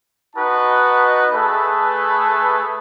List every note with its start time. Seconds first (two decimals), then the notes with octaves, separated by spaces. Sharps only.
0.36 D#4 F#4 B4 D#5 A5
1.32 A3 G#4 A4 B4